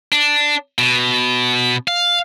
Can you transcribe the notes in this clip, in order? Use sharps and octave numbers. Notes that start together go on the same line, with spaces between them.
D4
B2
F5